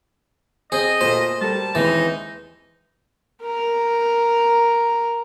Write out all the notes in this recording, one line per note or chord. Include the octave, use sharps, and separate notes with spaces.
C4 G#4 C5 D#5
A#2 A3 C5
G3 A4 A#4 A5
D#2 E3 G#3 C4 D#4
A#4 A#5